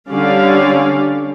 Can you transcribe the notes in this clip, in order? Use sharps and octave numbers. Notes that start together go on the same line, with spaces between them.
D3 G3 C#4 D5 F5